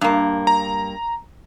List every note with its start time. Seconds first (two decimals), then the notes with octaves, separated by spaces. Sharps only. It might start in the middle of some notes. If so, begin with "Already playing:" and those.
0.01 G2 A#3
0.47 A#5